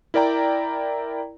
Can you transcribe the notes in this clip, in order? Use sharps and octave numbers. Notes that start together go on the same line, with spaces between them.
E4 A#4 D5 G5 A#5